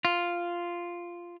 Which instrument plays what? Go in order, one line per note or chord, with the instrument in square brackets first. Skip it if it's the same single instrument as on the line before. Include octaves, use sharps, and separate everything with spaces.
[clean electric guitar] F4